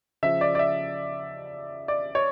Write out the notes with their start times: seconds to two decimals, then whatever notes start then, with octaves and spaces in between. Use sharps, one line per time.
0.23 C#3 F3 E5
0.41 D5
0.55 D5
0.59 E5
1.88 D5
2.15 C#5